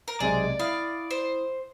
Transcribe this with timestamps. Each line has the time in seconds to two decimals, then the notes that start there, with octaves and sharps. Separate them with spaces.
0.08 A#4
0.20 B1 C3 G#3 G#4 D5
0.59 E4 F5 D#6
1.11 C5